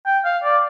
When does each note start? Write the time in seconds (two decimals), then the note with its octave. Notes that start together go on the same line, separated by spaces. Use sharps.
0.07 G5
0.25 F5
0.44 D5